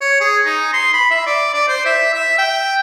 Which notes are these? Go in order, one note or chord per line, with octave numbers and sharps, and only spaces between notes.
C#5
G#4
D#4
C6
B5
E5
D5
D5
C5
E5
E5
G5